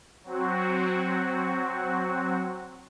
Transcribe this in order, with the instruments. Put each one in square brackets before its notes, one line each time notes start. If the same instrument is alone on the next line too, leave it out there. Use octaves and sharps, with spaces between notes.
[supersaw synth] F#3 C4 F#4